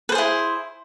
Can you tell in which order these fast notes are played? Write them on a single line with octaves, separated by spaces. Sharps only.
B4 C5 G#4 E4